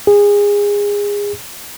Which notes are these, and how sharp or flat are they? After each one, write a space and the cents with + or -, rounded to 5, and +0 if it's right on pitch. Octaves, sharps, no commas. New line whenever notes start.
G#4 -25